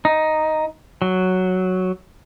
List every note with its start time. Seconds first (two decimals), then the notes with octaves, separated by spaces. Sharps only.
0.05 D#4
1.02 F#3